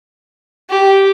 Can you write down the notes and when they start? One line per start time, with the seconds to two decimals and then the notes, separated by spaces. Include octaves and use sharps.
0.70 G4